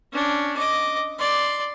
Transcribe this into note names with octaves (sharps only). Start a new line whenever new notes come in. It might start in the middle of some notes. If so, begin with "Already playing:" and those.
C#4 D4
D#5 D6
D5 C6